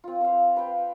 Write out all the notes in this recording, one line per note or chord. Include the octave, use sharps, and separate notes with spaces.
C4 F4
C5 F5
B4 F5 G5